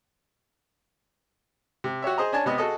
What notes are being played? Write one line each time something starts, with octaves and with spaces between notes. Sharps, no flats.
C3
F#4 G4 C#5 E5
G#4 C5 D#5 A#5
C#4 D4 G#5 A5
C3 B3 D#5
F#4 G#4 A4 D#5